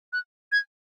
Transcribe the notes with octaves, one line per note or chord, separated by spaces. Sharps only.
F#6
G#6